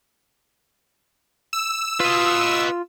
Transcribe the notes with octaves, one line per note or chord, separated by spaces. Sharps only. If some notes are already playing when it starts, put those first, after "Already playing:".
E6
F4 B4 D#5